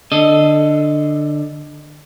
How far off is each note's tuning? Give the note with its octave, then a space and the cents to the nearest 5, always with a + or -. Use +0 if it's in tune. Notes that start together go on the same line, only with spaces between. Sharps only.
D3 +15 A4 +0 D#5 +0